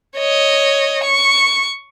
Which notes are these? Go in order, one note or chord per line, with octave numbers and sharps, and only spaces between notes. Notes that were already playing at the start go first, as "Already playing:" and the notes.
C#5 D#5
C#6